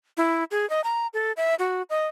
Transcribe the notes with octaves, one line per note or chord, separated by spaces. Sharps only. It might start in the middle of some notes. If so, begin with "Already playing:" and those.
E4
G#4
D#5
A#5
A4
E5
F#4
D#5